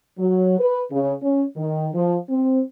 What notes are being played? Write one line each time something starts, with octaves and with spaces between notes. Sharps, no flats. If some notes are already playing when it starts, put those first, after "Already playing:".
F#3
B4
C#3
C#4
D#3
F3
C4